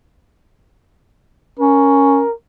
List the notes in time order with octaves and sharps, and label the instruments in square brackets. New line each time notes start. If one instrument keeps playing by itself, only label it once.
[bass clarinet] C#4 [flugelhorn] A#4